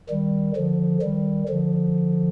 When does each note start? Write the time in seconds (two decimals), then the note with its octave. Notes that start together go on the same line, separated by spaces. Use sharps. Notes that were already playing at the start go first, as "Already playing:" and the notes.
0.09 D#3 G3
0.56 D3 F3
1.02 D#3 G3
1.49 D3 F3